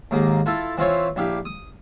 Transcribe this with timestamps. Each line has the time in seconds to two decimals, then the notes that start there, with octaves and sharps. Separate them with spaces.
0.11 D#2 G#2 A#3
0.46 E4 F4 A4
0.77 E3 C4 E4 F4 C5 C#5
1.16 A#1 E4 G4 F5
1.45 D#6